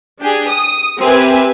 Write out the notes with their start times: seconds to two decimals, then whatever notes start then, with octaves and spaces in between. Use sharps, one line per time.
0.20 D4 G4 G#4
0.49 D#6
0.99 C4 G4 A#4 B4 E5 G#5